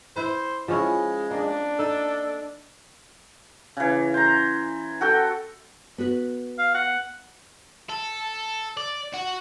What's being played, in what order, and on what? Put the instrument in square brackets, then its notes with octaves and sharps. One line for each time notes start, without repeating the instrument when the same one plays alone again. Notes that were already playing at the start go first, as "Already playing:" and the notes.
[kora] E4 B4 [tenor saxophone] C5
[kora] F3 C#4 E4 [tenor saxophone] G#3
[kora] A#3 [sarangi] D4
[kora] D#4 [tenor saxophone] A4
[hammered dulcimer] C#3 E3
C5 A#5
F#4 A4 G5
[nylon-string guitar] B3 F#4 B4
[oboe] F5
F#5
[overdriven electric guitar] A4
D5
F#4